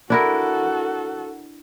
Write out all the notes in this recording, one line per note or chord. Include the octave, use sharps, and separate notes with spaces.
D4 E4 F#4 A4 A#4